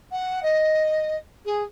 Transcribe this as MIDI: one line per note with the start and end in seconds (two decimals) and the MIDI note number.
0.11 0.40 78
0.42 1.16 75
1.45 1.62 68